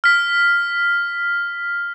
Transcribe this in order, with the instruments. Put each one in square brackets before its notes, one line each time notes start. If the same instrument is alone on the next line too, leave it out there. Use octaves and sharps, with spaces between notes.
[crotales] F6 B6